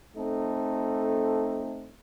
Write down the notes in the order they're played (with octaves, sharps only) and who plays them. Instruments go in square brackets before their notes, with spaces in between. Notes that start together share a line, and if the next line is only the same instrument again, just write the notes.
[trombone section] A3 C4 D#4 A4